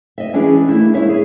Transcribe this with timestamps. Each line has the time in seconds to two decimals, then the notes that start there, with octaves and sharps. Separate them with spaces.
0.18 D#5 E5
0.33 E3 C#4 D4 E4 G#4
0.68 A3 A#3 E4
0.93 G#3 E4 C#5 E5
1.09 G#4